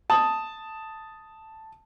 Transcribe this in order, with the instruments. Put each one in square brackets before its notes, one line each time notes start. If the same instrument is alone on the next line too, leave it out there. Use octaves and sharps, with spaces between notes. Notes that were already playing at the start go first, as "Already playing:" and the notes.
[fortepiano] A5 D#6